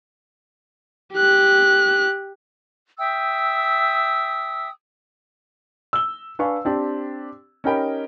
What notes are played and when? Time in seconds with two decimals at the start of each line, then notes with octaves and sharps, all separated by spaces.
1.15 G4 F#6
2.98 E5 G5 D#6 E6
5.93 E6 G7
6.39 D4 B4 F5 G#5 C#6
6.65 C4 D4 G4
7.64 C#4 D#4 G4 A#4 G5 B5